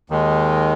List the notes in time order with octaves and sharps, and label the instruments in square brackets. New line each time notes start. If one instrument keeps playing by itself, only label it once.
[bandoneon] D#2 D#3 G#3